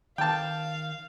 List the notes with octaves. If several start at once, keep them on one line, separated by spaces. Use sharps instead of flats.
D#3 F5 G5 A5